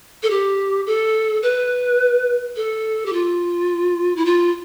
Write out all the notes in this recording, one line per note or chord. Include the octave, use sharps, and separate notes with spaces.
A4
G4
A4
B4
A4
G4
F4
E4
F4